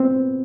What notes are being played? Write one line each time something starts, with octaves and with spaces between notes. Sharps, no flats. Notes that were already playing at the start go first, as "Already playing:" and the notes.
Already playing: B3 C4